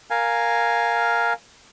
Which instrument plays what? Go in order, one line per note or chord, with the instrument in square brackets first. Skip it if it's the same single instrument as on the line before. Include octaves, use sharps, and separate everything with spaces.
[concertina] A#4 F5 G#5